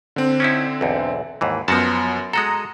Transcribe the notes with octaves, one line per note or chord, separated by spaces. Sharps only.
D3 C4
C#4 D#4 E4
B1 E2
D#2 G#2 E3
F#2 F3 B3 F#4 A5
G#3 F#4 A4 A#5 D#6